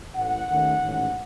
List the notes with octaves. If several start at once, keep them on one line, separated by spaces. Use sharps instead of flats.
A1 A2 E3 F#5
D#2 D#3 A3 C#4
A1 G#2 D#3 G#3 C#4